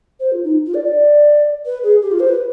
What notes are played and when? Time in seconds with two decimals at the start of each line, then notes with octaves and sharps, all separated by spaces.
0.20 C5
0.32 F4
0.44 D#4
0.66 F4
0.74 D5
0.84 D5
1.66 B4
1.83 G#4
2.02 G4
2.11 F4
2.20 C5
2.29 B4